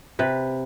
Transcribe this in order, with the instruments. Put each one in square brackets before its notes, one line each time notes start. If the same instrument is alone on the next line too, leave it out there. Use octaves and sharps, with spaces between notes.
[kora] C3 B4